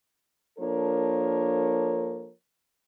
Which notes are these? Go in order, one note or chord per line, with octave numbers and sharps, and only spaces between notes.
F3 A#3 D4 A4 A#4 C#5